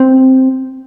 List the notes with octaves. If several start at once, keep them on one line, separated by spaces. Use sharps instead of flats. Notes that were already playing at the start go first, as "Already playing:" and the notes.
Already playing: C4